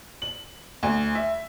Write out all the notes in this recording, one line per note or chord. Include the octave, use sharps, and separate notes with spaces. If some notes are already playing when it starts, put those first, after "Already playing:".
F#7
D2
E5